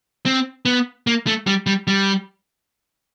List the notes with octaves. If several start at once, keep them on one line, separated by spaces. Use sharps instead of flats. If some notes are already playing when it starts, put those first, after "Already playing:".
C4
B3
A#3
A3
G3
G3
G3